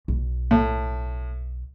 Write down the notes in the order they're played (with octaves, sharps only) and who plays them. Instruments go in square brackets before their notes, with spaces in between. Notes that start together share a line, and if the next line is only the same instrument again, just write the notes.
[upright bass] B1
[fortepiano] A2